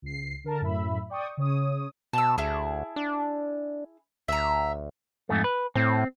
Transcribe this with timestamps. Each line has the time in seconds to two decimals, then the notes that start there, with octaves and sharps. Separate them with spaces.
0.02 C#2 C7
0.44 D3 A#4 A5
0.61 F#2 A2 E5 B5
1.10 D5 G5 C#6 D#6
1.37 C#3 C#5 D#6
2.13 B2 A5 E6
2.38 D2 E4 G#4 A5
2.96 D4
4.28 D2 E5 A#5
5.29 F2 G#2 A3
5.44 B4
5.75 A2 C4